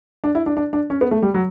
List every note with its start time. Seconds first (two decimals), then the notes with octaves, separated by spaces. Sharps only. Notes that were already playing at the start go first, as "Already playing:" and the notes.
0.24 D4
0.35 E4
0.46 D4
0.57 D4
0.73 D4
0.90 C#4
1.01 B3
1.11 A3
1.22 G3
1.34 F#3